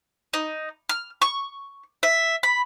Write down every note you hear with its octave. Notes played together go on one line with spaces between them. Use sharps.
D#4
F6
C#6
E5
B5